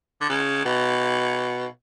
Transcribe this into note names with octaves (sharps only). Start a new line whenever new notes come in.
D3
C#3
B2